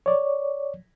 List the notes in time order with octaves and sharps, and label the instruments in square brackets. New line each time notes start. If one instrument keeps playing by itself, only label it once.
[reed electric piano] C#5 D5